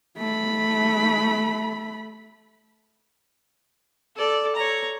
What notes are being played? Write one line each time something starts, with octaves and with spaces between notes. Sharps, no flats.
A3 B5
A4 D5
C#5 A#5